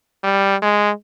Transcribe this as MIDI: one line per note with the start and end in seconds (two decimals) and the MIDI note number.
0.24 0.56 55
0.62 0.91 56